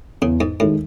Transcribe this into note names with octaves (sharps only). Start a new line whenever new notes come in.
E2 C#3
G#2
A2 D#3 G#3 D#4